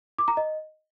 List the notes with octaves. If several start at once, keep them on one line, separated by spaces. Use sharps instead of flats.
D6
A#5
D#5